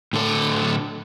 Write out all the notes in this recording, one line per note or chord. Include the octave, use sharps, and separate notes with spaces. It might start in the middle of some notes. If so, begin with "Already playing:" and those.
A2 D3 A4